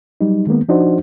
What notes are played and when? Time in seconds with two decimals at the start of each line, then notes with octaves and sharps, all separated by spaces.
0.21 F#3 G3 D#4
0.47 D#3 G#3 A#3 B3
0.69 F3 D4 D#4 F#4 C5